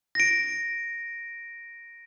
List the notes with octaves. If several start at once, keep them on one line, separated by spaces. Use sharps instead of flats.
A#6 D7